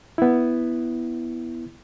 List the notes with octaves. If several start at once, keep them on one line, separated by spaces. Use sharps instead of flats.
B3 E4